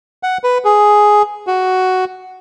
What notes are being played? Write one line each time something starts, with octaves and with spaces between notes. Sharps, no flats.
F#5
B4
G#4
F#4